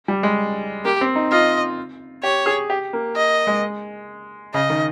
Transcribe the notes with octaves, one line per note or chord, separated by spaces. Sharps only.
G3
G#3
A#3 G4
C4
D#4
F4 D#5
G4 C#5
G#4
G4
A#3
D#5
G#3
C#3 D#5
D#3